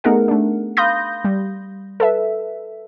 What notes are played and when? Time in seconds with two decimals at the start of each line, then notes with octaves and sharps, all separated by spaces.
0.04 A3 B3 D#4 G#4 A#4 F#5
0.28 A3 D4
0.77 F5 B5 C6 D#6 G6 A#6
1.25 G3
2.00 A4 B4 E5